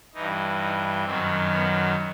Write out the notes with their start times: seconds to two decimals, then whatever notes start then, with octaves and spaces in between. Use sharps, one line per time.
0.14 G2 E3 D#4
0.60 D#4
1.04 F#2 D#3 F#3 C4
1.51 B3